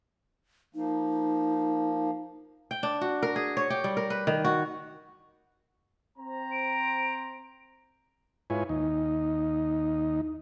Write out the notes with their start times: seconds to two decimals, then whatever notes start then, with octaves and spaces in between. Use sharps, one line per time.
0.75 F3 A#3 D#4
2.71 G5
2.83 D4
3.01 F#4
3.23 A#4
3.36 G#4
3.57 C#5
3.70 G4
3.84 G3
3.97 A#4
4.10 B4
4.27 D#3
4.45 F#4
6.18 C4 C5 A#5
6.52 D7
8.50 G#2 E4 F4 B4 C#5 G#5
8.69 D#2 D#4